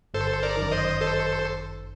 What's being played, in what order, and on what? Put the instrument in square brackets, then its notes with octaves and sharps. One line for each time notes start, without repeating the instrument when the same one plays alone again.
[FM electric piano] G1 [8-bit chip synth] A4 C5
[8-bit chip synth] A#4 D5
[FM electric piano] F#2 D#3
[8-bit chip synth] C5 D#5
A4 C5